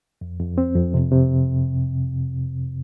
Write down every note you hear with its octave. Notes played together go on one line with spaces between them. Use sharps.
F2
F2
C4
F2
C3
C3